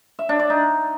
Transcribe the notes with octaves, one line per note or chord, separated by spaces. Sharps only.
E5
D4
D5
D#4